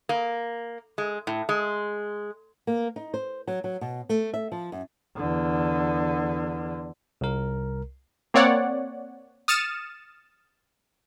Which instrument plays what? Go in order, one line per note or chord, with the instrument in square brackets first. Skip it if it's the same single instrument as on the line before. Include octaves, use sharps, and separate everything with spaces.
[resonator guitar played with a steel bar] A#3
G#3
A2
G#3
[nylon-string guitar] A#3
D#4
C5
F#3
F#3
B2
A3
E5
F3
F#2
[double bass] E2 D3
[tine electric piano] C2 A#4
[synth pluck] A#3 C4 C#5 D5 F#5
D#6 F6 A6 C#7 D#7 E7